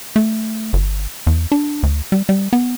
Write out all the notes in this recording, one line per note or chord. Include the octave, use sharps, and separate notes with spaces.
A3
G1
E2
D4
D2
G3
G3
B3